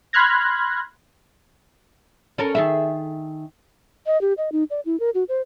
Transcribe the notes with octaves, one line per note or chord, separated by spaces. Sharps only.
B5 C6 F6 F#6 G#6 A#6
C#4 A4 A#4
D#3 G#4 E5
D#5
G4
D#5
D#4
D5
E4
A#4
F#4
C5